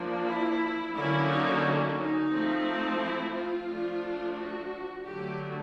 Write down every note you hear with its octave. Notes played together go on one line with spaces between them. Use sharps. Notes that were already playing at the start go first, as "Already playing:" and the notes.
Already playing: F3 A#3 D4
E4
D3 F#3 A#3 C#4 E4
D#4
D#4
F3 A3 C4
D#4
E4
F4
F3 A3 D4
F#4
D3 F#3 A3 G4